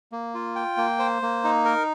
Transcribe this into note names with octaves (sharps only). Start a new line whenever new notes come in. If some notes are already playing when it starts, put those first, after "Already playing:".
A#3
F4
G5
A#3
C5
A#3
D#4
A#4